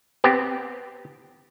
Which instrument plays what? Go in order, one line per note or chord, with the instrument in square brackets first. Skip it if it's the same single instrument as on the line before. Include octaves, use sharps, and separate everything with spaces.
[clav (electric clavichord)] B3 C4 G4